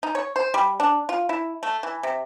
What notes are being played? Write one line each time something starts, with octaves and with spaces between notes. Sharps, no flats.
D#4
C#5
C5
G3
D4
F4
E4
A3
E3
C3